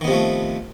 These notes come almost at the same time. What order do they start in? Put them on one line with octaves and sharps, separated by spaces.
D#3 B3 C3 F3 A3